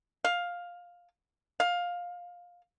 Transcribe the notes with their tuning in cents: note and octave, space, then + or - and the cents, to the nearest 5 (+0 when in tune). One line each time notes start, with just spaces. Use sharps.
F5 +10
F5 +15